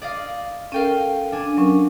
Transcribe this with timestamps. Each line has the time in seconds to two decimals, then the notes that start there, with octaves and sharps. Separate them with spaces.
0.02 D5 D#5 F5
0.72 C#4 A4 A#4 F5 G5 D#7
1.32 D4 G#5
1.57 F#3 C#4 A#4